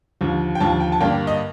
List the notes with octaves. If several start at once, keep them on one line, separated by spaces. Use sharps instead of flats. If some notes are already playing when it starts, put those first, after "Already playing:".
D#2 D3 F3
G5
D#2 D3 F3 A5
G5
A5
G2 D3 G3 A#3 D4 G5
D#5